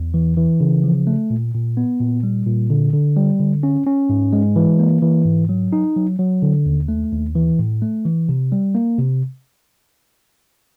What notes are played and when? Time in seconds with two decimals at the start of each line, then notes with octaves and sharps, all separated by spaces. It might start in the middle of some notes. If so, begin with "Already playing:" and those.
Already playing: E2
0.14 E3
0.37 E3
0.60 C#3
0.84 F3
1.07 A3
1.30 A#2
1.54 A#2
1.77 B3
2.00 A#2
2.23 G3
2.46 A#2
2.70 D3
2.93 D3
3.16 G3
3.40 D3
3.63 C#4
3.86 C#4
4.09 G#2
4.33 G#3
4.56 E3
4.80 A#3
5.02 E3
5.25 G#2
5.49 F#3
5.73 D#4
5.96 F#3
6.19 F#3
6.42 D3
6.66 D#2
6.88 A3
7.12 D#2
7.36 E3
7.59 A2
7.82 A3
8.05 E3
8.29 C3
8.52 G3
8.75 A#3
8.98 C3